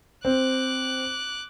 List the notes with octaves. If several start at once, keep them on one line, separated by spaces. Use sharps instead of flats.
C4 D6 F#6